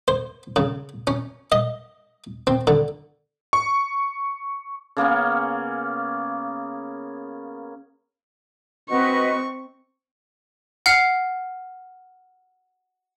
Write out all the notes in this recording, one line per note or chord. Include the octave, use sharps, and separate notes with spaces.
C5
C#3
C#4
D#5
C4
D3
C#6
C#3 A#3 B3 C#4
C4 F#4 B4 D#5 C#6
F#5 F6 C7